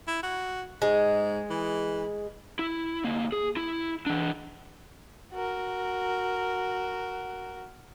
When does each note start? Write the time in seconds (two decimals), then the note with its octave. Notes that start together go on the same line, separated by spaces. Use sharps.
0.08 E4
0.23 F#4
0.82 G#2 G#3
1.50 E3
2.59 E4
3.04 D2 A#3
3.32 G#4
3.57 E4
4.06 E3 D4
5.33 F#4 A#4